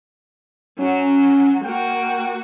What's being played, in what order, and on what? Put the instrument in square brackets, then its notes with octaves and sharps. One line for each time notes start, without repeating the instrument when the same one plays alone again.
[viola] F#3 F#4 [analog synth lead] C#4
[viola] A#3 F#4 [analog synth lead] G5